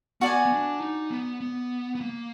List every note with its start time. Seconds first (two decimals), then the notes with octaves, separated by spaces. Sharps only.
0.21 B3 F#4 D5 G#5
0.45 B3
0.51 D4
0.81 D#4
1.10 B3
1.41 B3
1.95 B3
2.01 A#3